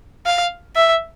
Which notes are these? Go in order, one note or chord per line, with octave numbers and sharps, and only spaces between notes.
F5
E5